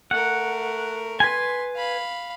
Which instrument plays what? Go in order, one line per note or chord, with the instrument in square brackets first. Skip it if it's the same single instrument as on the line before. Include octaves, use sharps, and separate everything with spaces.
[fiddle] A3 A#4 [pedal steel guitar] F#5
[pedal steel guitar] B4 G#5 [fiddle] C6
[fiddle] F5 B5